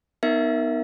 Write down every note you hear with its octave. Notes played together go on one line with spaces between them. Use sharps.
B3 D#4 A#4 E5